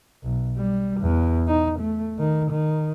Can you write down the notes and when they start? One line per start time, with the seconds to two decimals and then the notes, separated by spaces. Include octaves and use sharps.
0.23 B1
0.57 G3
1.01 E2
1.47 D#4
1.79 A3
2.19 D#3
2.51 D#3